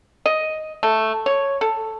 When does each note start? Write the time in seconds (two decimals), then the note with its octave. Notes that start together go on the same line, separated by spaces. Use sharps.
0.26 D#5
0.83 A3
1.26 C#5
1.61 A4